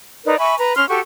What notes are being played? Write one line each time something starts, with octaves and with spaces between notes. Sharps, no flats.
D#4 A#4 B4 D5
E5 G#5 B5 C#6
B4 A#5
C#4 C6 F6
F#4 G4 A4 C#6